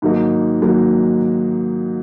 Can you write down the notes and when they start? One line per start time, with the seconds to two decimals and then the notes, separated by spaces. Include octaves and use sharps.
0.02 G#2 D#3 F#3 A#3 D#4
0.62 G#2 D#3 F#3 A#3 D#4